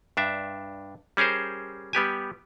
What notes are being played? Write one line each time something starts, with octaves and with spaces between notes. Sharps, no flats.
G2 D4 E5
G3 C#4 G#4 A#4 C5
G3 B3 G4 G#5